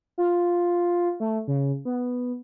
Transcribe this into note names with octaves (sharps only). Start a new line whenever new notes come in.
F4
A3
C#3
B3